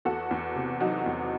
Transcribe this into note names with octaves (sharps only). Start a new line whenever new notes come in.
E2 F#4 A4
E2
C3
F#3 D#4 F#4
E2